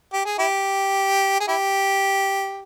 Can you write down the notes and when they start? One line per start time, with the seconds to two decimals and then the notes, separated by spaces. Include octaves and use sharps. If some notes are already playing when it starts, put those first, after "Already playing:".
0.13 G4
0.26 G#4
0.39 E4 G4
1.40 G#4
1.48 E4 G4